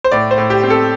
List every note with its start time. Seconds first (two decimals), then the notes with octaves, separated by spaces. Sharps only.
0.04 C5
0.12 A2 D5
0.31 C5
0.38 A2
0.50 G4
0.63 C4
0.70 A4